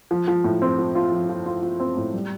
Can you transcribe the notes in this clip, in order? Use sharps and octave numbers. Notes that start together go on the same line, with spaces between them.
F3
F3
A2
C4
F3
F4
F3
F3
F4
F4
C4
A2
G3